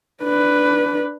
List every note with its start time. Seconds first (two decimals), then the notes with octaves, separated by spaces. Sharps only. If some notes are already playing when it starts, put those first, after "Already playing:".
0.23 D4 B4